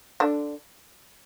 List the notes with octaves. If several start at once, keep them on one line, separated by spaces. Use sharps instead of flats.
D3 D4